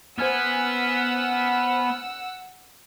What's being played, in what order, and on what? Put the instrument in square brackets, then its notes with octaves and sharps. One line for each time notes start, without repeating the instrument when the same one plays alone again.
[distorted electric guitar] B3 [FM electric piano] C5 G#5 F6 [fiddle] F#5 E6